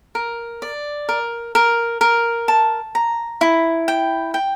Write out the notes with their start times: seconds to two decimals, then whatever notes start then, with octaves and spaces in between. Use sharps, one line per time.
0.15 A#4
0.62 D5
1.09 A#4
1.55 A#4
2.01 A#4
2.48 A5
2.95 A#5
3.41 E4
3.88 G5
4.34 G5